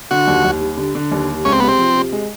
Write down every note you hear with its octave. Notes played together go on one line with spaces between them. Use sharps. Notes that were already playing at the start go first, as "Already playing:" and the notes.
D3 F#4
D#2
D#2
G3
D3
D3
D#2
G3
C#2 C#4
C4
C3 B3
C4
F3
C3
G#3